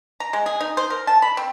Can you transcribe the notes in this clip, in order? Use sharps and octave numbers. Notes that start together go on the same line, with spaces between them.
A#5
G#3
G#4
D#4
C5
A#4
A5
B5
C4